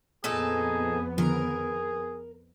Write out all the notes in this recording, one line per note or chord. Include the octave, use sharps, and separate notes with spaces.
F2 A#2 B3 D#4 G#4 A4
D3 D#3 F3 G#4 A#4